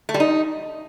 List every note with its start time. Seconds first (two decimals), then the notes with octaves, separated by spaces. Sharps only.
0.09 A3
0.14 G3
0.20 D#4